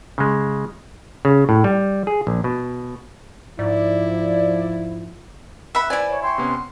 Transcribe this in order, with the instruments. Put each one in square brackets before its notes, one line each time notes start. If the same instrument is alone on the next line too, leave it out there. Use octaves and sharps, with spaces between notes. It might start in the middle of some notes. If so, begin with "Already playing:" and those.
[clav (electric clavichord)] C#3 G#3
C#3
A2
G3
G#4
A#1
B2
[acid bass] G#2 [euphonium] F3 [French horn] E4 [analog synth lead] D5
[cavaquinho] E5 F#5 B5
[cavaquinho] E4 G#5 [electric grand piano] B4 C5 D5
[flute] C#5
[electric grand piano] E5 G5 C#6 [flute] C6
[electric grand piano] C3 B3 C#4
C6